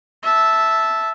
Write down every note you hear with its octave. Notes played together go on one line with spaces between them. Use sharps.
E5 A5